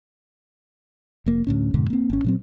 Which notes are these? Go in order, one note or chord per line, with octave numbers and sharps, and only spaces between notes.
F1 A#3
D2 A2 C#4
F2 G#2 B2 D3
A#3 C4
G#1 C#4
A#2 F#3 C4